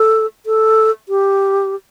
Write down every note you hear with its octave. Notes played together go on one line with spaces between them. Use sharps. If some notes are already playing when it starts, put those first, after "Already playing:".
Already playing: A4
A4
G4